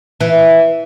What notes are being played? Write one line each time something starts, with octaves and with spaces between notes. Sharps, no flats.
E3